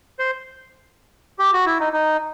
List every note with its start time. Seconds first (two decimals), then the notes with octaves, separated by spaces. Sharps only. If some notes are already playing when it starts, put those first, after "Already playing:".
0.19 C5
1.39 G4
1.53 F#4
1.66 E4
1.80 D#4
1.93 D#4